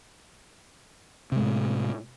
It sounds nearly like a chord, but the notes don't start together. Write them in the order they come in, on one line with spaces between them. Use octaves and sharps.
C3 G#3 A2